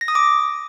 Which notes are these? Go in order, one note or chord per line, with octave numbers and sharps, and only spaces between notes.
A#6
D#6
D6